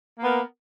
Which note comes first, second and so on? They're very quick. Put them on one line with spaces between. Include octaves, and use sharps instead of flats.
A#3 B3 A#4